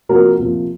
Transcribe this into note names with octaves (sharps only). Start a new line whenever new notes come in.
C3 F3 A#3 F#4 A#4
C3 F3 A#3